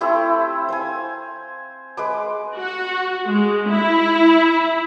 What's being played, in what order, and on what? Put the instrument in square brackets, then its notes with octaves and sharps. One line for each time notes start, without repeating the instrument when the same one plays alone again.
[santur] A3 C4 E4 G4
C5 F5 G#5
G#3 B4 D6
[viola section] F#4
G#3
E4